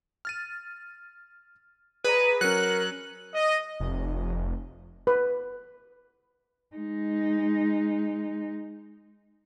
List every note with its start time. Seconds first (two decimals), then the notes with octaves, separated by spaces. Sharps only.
0.25 F6 A6 D#7
2.04 G#4 B4 D5 A#5 D#7
2.41 F#3 C#4 A#4 F#6 C#7
3.35 D#5
3.80 F1
5.07 B4
6.76 G#3 D#4